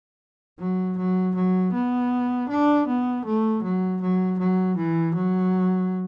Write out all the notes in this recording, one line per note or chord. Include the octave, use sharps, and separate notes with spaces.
F#3
F#3
F#3
B3
D4
B3
A3
F#3
F#3
F#3
E3
F#3